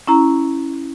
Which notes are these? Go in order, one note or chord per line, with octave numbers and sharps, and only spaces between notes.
C#4 E4 A#5